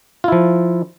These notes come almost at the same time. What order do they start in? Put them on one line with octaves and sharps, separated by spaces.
F4 E4 F3